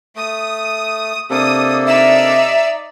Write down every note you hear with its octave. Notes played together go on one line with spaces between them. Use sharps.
A3 D#6
C3 A#3 D4 A4 D#6
D#4 D5 E5 E6